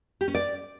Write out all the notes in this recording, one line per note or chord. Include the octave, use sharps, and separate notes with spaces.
G4
C#4
D5